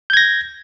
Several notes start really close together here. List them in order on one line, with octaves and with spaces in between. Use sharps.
G6 G#6 A#6